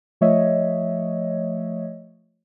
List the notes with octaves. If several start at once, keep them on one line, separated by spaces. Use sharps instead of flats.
F3 A3 C#5 D#5 E5